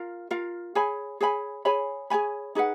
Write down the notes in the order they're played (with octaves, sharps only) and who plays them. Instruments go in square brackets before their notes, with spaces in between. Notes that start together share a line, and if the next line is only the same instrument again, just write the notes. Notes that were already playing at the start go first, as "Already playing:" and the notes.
Already playing: [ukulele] F4 A#4 F5
F4 A#4 F5
G#4 C#5 G#5 B5
G#4 C#5 G#5 B5
G#4 C#5 G#5 B5
G#4 C#5 G#5 B5
D#4 G#4 B4 F#5